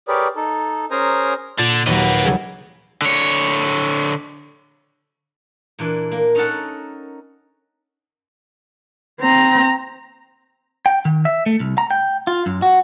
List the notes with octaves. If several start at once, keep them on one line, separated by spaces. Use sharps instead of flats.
G4 G#4 A#4 B4 C#5 D5
D#4 A4
C#4 G#4 A#4 C5 G#5 A#5
A#2 D3
D#2 F#3 B4 D#5
C#3 F#3 G3 G#4
D3 C#5
A#2 E3 D4
A#3
C#4 D#4 A4 A#4 F#5 A5
C4 A#5
G5
D#3
E5
A3
C2
A#5
G5
F4
F#2
F#4